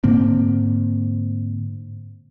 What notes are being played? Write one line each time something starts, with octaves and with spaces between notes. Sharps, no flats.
G#2 D3 A#3 C4